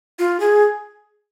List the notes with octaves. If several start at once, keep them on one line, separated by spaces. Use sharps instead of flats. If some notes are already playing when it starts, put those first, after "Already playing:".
F4
G#4